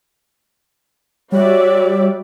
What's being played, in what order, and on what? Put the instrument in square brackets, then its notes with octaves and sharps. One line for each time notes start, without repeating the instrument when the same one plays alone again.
[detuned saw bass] G3 [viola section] F#4 D5 E5 [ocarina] C#5